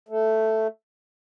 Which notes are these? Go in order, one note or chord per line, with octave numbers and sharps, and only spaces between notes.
A3